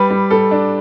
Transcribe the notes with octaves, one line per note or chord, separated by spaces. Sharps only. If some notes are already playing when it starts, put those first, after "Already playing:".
Already playing: G3 B4
G3
G3 A4
D4